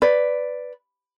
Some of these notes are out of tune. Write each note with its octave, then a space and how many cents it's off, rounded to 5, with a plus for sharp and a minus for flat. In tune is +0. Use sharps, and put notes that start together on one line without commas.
B4 +5 D5 +0